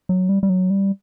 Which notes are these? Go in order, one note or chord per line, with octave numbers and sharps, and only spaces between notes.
F#3
G3
G3
F#3
G3